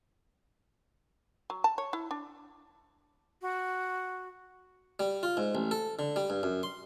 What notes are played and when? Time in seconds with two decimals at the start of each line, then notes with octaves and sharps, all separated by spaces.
1.50 F#3
1.64 A5
1.78 C#5
1.93 E4
2.11 D4
3.42 F#4
4.99 G3
5.23 F4
5.37 G#2
5.55 A1
5.71 A4
5.99 D3
6.16 G3
6.30 G2
6.43 F#2
6.63 C6